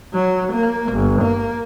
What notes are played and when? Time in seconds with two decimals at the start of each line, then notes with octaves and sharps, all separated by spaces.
0.14 F#3
0.53 A#3
0.93 G1
1.22 A#3